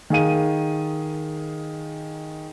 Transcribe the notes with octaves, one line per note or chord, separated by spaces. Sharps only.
D#3 G#4 F5 D#7